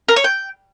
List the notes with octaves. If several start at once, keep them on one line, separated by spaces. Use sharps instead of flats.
A#4
C#5
G5